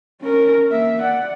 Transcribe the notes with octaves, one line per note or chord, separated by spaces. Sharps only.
C#4 A#4
A#3 E5
D5 F#5